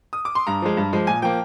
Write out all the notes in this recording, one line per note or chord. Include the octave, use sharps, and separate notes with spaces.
D#6
D6
C6
G2 A#5
F3 G#3
G2
F3 G#3
A#2 G#5
F3 A#3 G5